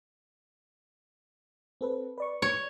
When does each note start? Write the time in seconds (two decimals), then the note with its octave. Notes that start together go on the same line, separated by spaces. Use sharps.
1.81 C4 A4 B4
2.18 B4 D5 C#6
2.42 C#5